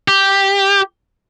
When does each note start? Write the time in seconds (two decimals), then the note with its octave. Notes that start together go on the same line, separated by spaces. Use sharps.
0.08 G4